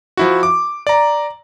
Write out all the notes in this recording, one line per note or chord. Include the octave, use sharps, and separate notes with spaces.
F3 E4 F#4
D6
D5 A#5